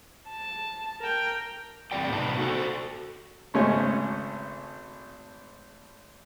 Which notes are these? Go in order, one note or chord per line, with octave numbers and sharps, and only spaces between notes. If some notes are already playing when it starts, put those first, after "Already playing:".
A5
A#4 G5
E2 G3 C4 A4 D5 G5
A2 C3 B3 D#4 A5
F#4 A4 C5
G#1 C#3 G#3 A3 C#5 G#5